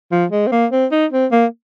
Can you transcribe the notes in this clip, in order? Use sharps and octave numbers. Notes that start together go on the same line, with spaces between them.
F3
G#3
C4
A#3
C4
D#4
C4
A#3